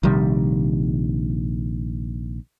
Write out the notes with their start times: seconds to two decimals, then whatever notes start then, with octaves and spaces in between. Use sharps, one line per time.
0.03 A#1 C3 D#3 G3